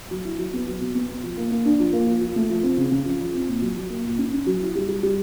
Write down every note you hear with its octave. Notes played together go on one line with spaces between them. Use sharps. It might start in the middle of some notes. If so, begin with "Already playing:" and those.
F#3
E4
F#3
B3
F#3
B2
B3
B2
F3
A#3
A#3
D4
F3
A#3
F3
F3
A3
F3
C4
C#3
C#3
F3
F3
C4
A#2
F#3
F#3
A#3
A#2
C#4
C#4
F#3
E4
G3
G3
G3